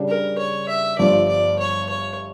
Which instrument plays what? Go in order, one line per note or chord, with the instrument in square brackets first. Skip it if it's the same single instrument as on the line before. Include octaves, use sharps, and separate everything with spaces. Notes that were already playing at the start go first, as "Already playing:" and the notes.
Already playing: [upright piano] C#3 G3 D4
[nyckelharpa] A#4
C#5
E5
[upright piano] G1 G2 F3 [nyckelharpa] D5
[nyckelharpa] D5
C#5
C#5